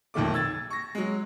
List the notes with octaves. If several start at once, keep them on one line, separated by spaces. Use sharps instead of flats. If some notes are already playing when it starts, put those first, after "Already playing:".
B1 F2 D#3 A3 D6
E6 G#6 A6
C#6 A#6
F#3 G#3